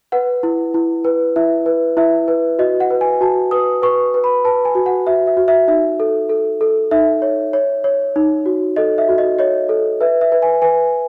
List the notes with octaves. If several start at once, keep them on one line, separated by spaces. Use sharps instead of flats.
B4 F#5
E4
E4
B4
E4 E5
B4
E4 E5
B4
F#4 D#5
F#5
B4
G#5
F#4 A5
B4 D#6
B4 C#6
B4
B5
B4 A5
G#5
F#4
F#5
F#4 E5
E5
F#4
E5
D#4 E5
A4
A4
A4
D#4 E5
C#5
C#5
C#5
D#4
F#4
A4 D#5
E5
F#4
D#5
C#5 D#5
A4
B4 E5
E5
B4
G#5
B4 G#5